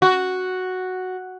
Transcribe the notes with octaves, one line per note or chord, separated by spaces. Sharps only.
F#4